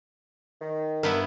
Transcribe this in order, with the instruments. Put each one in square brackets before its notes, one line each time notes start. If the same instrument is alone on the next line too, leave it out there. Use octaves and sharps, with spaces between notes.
[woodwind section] D#3
[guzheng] G2 B3 E4 [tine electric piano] A#4